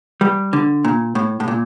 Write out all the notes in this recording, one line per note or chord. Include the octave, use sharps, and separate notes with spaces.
G3
D3
A#2
A2
A2
A#2